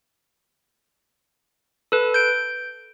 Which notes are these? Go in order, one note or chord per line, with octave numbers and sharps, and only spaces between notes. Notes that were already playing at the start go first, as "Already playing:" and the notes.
A4 B4
G6 D7